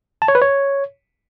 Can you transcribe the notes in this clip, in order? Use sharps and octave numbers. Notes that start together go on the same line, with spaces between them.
A5
C#5
B4
C#5